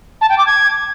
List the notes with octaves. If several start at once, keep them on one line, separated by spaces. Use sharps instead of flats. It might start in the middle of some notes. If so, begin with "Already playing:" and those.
A5
G5
D6
G#6